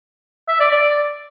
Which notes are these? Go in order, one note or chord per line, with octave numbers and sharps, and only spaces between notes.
E5
D5
D5